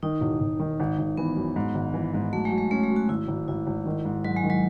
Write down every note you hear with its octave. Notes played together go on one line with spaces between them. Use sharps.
D#3 D#4
E1
E1
D#3
G#1
G#1
E3 B3
F#2
G#2
G#1
E3
G#2
F#3 A3
G#3
F#3
G#3
A3 C#4
G#3
F#3
F#4
G#1 E4
G#1
G#1 E4
G#1
D#3
G#2
G#2 F#3
G#3
D#3
F#3